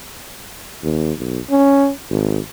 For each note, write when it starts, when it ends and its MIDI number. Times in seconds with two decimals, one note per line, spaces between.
0.83 1.12 39
1.18 1.40 35
1.50 1.90 61
2.10 2.39 32